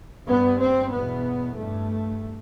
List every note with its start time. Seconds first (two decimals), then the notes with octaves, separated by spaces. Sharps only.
0.27 G2 B3
0.59 C4
0.92 E2 B2 B3
1.56 G2 A3